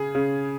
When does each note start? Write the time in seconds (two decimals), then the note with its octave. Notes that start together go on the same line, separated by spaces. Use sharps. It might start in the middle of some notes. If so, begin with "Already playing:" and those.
Already playing: C#3 G#4
0.15 C#3